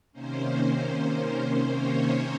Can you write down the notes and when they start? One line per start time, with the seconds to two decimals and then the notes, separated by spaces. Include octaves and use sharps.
0.12 C3 D#3 A#3 C#4 C5
1.68 C#5